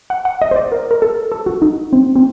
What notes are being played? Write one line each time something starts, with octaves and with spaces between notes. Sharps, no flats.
F#5
F#5
D#5
C5
D5
A#4
A#4
A4
A4
F#4
D#4
C4
C4